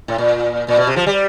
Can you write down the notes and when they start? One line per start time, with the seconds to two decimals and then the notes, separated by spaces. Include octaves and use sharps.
0.08 A2
0.18 A#2
0.68 A#2
0.77 B2
0.87 C3
0.96 F3
1.07 G3